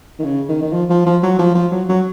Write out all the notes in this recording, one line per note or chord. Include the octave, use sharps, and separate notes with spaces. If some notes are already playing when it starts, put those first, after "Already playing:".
D#3
C#3
D#3
D#3
F3
F3
F3
F#3
F3
F3
F#3
F#3